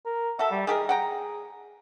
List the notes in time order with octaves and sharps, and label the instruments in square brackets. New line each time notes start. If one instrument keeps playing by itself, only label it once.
[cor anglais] A#4
[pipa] F#4 A4 [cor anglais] E5
[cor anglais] G3
[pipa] D#3 G4 A#4 [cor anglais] G#4
[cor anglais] G#4 [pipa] F#5 G5 A#5